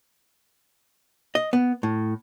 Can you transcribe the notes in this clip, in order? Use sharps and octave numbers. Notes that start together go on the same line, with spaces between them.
D#5
B3
A2